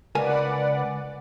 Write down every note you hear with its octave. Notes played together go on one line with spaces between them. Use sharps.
C#2 A#4 B4 D5 F#5 G#5